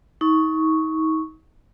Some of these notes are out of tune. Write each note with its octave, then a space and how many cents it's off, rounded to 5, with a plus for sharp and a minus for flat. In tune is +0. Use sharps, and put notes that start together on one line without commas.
D#4 +35 C#6 +0